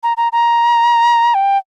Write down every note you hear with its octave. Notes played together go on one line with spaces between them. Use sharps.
A#5
A#5
A#5
G5